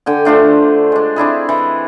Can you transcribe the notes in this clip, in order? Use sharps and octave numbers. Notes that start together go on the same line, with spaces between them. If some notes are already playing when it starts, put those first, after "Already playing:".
D3 G5 G#5
A3 D4 F4 C5
G#3 D4
C4 D4 E4 G#4
E3